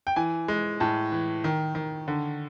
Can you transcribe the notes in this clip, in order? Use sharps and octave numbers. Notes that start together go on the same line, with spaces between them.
G5
E3 G#5
G#3
A2 A5
E3
D#3
D#3
D3